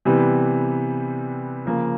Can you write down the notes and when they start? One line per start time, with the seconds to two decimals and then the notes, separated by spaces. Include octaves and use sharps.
0.05 C3 E3 G3 B3
1.65 C#3 F3 A#3